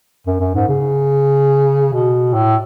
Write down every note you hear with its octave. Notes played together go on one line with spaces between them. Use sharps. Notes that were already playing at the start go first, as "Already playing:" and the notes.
F#2
F#2
G#2
C#3
B2
A2